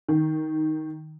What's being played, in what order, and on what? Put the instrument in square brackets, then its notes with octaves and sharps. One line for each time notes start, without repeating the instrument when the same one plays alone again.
[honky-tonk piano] D#3